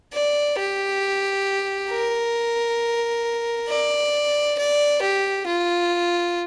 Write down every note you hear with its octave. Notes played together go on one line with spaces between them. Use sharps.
D5
G4
A#4
D5
D5
G4
F4